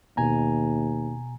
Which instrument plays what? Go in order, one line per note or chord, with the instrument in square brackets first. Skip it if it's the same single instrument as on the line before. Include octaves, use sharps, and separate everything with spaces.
[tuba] D#2 [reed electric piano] B2 G#5 A#5